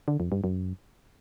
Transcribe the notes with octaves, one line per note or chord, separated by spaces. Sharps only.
D3
F2
G2
F#2